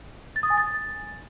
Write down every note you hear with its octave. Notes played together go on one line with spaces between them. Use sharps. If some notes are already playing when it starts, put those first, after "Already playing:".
A6
D#6
G#5
A6